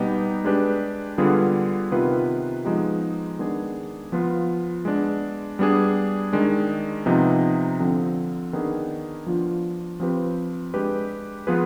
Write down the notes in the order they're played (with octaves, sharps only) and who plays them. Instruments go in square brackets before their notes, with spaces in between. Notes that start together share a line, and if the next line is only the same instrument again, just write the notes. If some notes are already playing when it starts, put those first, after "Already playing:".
Already playing: [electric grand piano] B2 G3 B3 D#4 G4
G#3 D4 G4 B4
D3 G3 B3 F4 G#4
C3 D#3 B3 F4 B4
F3 G#3 B3 D#4 G4
D#3 G#3 B3 D4 G#4
F3 B3 F4
G#3 B3 D4
G3 B3 D4 G#4
D#3 G#3 D4
C3 F3 B3 D#4
D3 F3 C4
D#3 B3 D4 G#4
F3 B3 D4 F4
F3 C4 G4 B4
G#3 D4 G4 B4
F3 B3 F4 G#4 B4